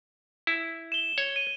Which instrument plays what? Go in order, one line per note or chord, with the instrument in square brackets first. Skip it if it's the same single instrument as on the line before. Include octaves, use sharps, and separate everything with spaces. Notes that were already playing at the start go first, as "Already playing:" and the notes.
[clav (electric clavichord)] E4
[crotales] E7 G7
[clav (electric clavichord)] C#5
[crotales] D#7